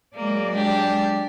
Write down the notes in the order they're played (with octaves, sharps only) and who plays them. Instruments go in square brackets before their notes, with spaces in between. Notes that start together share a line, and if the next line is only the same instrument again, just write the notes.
[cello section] F#3 G#3 D5 [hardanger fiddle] A#3
[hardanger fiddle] D4 G4